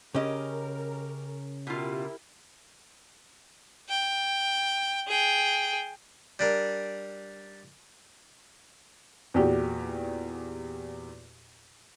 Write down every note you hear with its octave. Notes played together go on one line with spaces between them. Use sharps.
C#3 C#4 G4 A#4 D#5
B2 E4 F4 G4 A#4
G5
G#4 G5
G3 D4 A#4
E2 A#2 F#4 G4